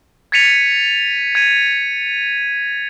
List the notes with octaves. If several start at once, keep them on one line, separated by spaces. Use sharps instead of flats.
G#6 A6 B6 C#7 D#7 F7
G#6 D#7